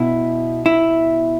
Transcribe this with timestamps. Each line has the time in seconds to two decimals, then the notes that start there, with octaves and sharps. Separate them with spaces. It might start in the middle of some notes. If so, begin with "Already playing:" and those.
Already playing: B2 E4
0.66 E4